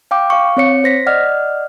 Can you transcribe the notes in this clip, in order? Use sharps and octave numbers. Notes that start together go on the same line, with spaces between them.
F5 G5 D6
F5 C#6
C4 C#5 C#7
C5 A#6 B6
D5 D#5 F#5 F6